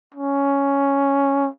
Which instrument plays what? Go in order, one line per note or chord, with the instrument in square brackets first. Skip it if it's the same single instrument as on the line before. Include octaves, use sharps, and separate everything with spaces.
[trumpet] C#4